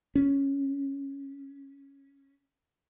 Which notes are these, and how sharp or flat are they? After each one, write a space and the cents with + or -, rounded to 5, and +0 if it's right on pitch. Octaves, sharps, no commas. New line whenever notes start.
C#4 -5